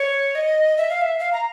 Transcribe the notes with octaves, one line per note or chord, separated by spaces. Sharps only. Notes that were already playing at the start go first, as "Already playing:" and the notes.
Already playing: C#5
D#5
E5
F5
E5
F5
A#5